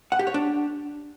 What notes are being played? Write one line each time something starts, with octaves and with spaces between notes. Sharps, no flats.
F#5
G4
C#5
D4